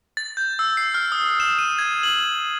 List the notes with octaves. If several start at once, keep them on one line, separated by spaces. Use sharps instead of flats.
A6
G6
E6
C7
F6
D#6
E7
D#7
G#6
F#7